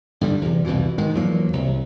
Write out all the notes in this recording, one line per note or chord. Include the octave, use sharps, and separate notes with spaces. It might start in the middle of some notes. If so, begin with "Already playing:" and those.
G2 D3 G3
E2 C3
C2 F2 B2 E3
G#2 D#3 G#3
E2 F3 F#3 A#3
C2